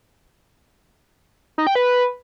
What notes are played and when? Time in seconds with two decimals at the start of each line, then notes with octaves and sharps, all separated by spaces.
1.58 D#4
1.67 G5
1.75 B4